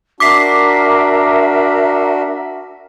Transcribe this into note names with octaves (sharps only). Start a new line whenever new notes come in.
D4 F#4 A#4 E5 D6 B6 C7